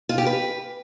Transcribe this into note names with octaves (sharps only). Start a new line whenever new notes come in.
F4
G4
B4